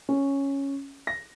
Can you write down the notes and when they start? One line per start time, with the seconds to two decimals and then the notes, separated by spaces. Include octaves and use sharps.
0.09 C#4
1.07 A#6